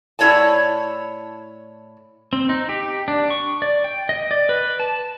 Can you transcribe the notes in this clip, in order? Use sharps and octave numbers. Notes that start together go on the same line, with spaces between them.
A2 E4 F4 C#5 D5 A5
C4
D#4
G4
D4
C#6
D5
G5
D#5
D5
B4
A5